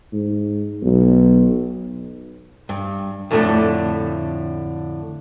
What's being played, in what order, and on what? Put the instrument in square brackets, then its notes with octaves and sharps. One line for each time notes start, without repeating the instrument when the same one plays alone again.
[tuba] G#2
B1
[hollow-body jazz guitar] G2
F2 A2 D3 G#3 A3 D4